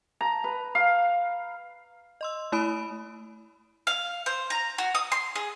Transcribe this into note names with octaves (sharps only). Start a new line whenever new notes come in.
A#5
B4
F5
D#5 C6 E6
A3 E4 B5 D#6 D7
F5
C5
A#5
F#4
D#6
C6
G#4